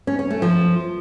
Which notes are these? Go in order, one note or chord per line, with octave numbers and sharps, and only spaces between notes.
C#4
C#4
A3
F3